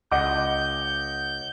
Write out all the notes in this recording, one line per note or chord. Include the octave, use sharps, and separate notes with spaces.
C#2 D#5 F#5 D6 G6